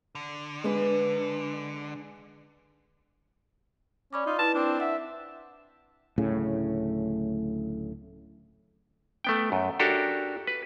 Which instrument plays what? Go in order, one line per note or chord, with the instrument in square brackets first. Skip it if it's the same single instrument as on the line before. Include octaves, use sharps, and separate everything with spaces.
[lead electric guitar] D3
[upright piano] G#3 [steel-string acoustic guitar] D4 B4
[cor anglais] C#4 [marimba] D5 B5 D6
[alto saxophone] D#4 [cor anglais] F4
[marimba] E4 B4 [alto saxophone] A5
[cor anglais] C4 [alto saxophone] D4
[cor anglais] E5 [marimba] F#5
[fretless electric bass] D1 A2 C#3
[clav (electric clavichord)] A3 B3 G5
F#2
D4 F#4 G4 A4 A#4
B4